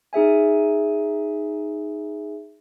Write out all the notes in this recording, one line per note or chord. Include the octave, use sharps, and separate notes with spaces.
D#4 G#4 E5 G#5